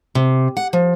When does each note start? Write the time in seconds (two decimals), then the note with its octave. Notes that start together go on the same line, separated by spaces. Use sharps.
0.15 C3
0.57 F#5
0.73 F3